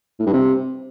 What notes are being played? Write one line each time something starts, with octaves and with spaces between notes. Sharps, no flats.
A2
G2
C3